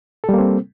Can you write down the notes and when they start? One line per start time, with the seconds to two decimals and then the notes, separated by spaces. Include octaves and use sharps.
0.24 A4
0.29 G3
0.34 A#3
0.39 C4